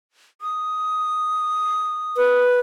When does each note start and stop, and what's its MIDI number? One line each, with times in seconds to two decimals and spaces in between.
0.41 2.41 87
2.17 2.60 71